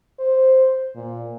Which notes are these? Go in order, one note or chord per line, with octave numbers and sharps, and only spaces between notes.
C5
A#2